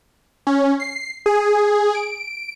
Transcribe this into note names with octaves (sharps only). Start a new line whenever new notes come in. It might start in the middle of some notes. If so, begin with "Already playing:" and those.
C#4
C7
G#4
D7